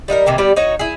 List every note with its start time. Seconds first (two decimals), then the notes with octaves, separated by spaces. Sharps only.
0.08 G3 D#4 F4 A#4
0.26 C3 D#3 E3 A#3
0.38 G3 B3 G4 D5
0.56 D#4 F#4 C#5
0.79 E4 G#4